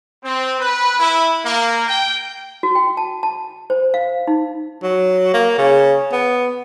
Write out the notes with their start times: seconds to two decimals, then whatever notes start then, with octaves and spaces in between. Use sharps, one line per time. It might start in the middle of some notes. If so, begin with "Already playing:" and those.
0.24 C4
0.60 B4
1.00 E4
1.44 A#3
1.88 G5
2.63 F#4
2.75 G5
2.97 A5
3.23 A5
3.70 C5
3.94 F5
4.28 D#4
4.83 F#3
5.34 A#3
5.58 C#3
6.12 B3